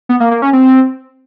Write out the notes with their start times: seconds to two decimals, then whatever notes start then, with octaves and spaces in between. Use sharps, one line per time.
0.09 B3
0.20 A#3
0.31 A#3
0.42 C#4
0.53 C4